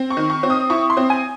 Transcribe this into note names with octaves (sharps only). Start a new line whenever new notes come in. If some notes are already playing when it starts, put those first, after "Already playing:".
Already playing: C4
C#6
D#3
C#6
C4
D#6
E4 C#6
C6
C4
G#5